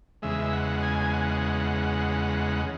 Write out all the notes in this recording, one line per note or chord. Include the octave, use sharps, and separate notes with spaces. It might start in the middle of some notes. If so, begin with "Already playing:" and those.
E2 C#3 G#3 E5
F#5
G#5
F#5